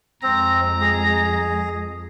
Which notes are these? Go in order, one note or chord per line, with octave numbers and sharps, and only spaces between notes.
F2 F3 G#3 C4 A#5
G#4